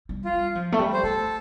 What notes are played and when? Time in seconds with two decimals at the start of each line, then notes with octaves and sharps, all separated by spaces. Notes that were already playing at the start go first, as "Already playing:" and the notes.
0.09 G3
0.25 F4
0.33 G3
0.55 F3
0.72 A3
0.79 G3
0.93 C5
1.03 A3 A4